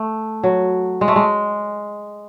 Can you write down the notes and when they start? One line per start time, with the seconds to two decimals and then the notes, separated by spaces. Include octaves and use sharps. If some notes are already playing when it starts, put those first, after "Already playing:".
Already playing: A3
0.44 F#3
1.01 G#3
1.08 A3
1.16 G#3